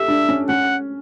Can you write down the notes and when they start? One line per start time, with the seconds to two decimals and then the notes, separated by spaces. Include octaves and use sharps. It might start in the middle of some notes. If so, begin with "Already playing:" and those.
Already playing: G4 A4 E5
0.08 D4
0.29 C#4
0.49 C#4 F#5